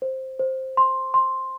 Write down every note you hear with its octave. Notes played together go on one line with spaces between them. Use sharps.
C5
C5
C6
C6